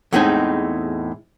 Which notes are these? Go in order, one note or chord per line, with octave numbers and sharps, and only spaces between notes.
E2 A2 G#3 C4 D#4 G#5